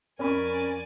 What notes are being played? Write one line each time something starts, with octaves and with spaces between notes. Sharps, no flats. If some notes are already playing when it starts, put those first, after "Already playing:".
F2 C#4 A#4 D5 G#5 B5 C#6